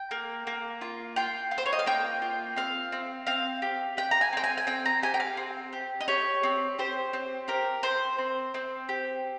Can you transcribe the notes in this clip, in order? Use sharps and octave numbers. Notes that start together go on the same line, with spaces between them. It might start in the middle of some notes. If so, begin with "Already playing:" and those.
Already playing: G5
A#3
A#3
F4
F4 G5
F4
C5
C#5
D#5
F5
A#3 G5
F4
C4 F5
C4
C4 F5
G4
G4 G5
A#5
G#5
C4 G5
G#5
G#5
C4 G5
A#5
G4 G#5
G5
F5
C4
G4
D#5
G4 C#5
C4
G4 C5
C4
G4 A#4
C4 C5
C4
C4
G4